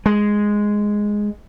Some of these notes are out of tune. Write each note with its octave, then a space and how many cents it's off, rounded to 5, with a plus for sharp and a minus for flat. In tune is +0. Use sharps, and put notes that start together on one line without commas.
G#3 +0